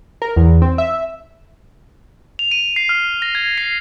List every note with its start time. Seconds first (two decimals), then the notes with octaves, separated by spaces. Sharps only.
0.22 A#4
0.36 E2
0.62 C4
0.78 E5
2.39 F7
2.51 D#7
2.76 C7
2.89 F6
3.22 A#6
3.35 G#6
3.58 C7